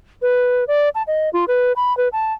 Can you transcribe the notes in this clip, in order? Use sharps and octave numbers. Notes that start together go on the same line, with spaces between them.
B4
D5
A5
D#5
F4
B4
B5
B4
A5